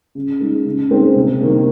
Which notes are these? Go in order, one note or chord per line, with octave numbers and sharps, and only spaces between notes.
C#3
G#3 D#4
C#3
G#3 C4 D#4
C3
D#3 A#3